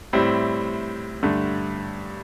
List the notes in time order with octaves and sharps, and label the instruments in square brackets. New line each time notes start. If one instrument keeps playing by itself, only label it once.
[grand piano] A2 G3 C4 E4
G2 D3 A3